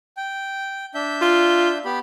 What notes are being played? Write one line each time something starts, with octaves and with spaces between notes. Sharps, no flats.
G5
D4 E5 G6
F4
B3 G4 B5